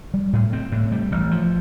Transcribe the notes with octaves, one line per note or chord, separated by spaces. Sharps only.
G3
A2
C4
A2
G3
A1
F3